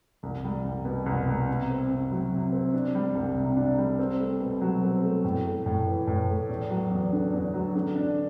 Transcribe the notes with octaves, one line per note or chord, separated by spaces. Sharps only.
C2
G3
C2
B2
C2
G3
C3
C4
C3
F#3
C3
C4
D4
G3
C2
C3
D4
G3
C4
A3
B2
F#3
C4
A3
A2
A3
A2
E3
A2
A3
E2
F#3
E2
D3
E2
F#3
D3
D4